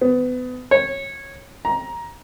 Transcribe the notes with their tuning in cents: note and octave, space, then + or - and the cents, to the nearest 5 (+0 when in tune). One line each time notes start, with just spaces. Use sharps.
B3 +25
C#5 -15
A#5 +15